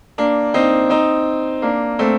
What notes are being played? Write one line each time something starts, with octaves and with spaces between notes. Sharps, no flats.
A#3 D4
C4 D#4
C4 D#4
A#3 D4
A3 C4